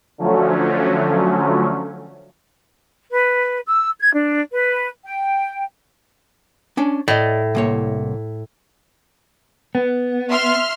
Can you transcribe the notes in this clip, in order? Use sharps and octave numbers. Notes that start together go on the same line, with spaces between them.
D3 F3 F#3 A3 C#4
B4
E6
G#6
D4
B4
G5
C#4 D4
A2 D5 D#5
C2 A#3 C#5
B3
E5 C6 F6